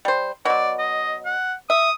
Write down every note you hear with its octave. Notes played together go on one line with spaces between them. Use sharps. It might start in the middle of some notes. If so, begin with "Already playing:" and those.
G3 C5
B2 F#3 D5
D#5
F#5
E5 D#6